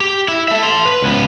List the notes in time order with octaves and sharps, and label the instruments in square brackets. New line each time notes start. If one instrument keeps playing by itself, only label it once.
[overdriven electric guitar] G4
E4
A4 E5
A5 C6
B4
C#2 B3